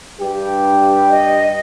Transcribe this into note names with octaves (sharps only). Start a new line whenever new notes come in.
G2 G4
D#5